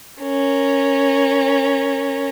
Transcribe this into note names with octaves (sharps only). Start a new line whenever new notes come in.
C#4 A#4